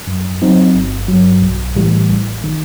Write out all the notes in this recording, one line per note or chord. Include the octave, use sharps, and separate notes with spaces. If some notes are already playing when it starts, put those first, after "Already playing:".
F#2
F#3 C4 D#4
G1
G2 F#3
B1
A2 E3 G3
A1
D#3